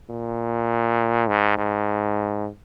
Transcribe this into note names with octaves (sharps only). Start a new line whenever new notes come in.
A#2
G#2
G#2